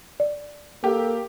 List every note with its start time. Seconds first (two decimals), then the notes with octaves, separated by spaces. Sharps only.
0.20 D5
0.84 A#3 G4 A4